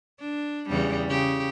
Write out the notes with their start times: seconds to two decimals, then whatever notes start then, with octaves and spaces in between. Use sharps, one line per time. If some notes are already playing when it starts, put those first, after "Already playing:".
0.20 D4
0.69 E2 C#3 G3
1.08 C#3 G4